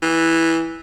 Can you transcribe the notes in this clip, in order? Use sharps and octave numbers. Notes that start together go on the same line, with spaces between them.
E3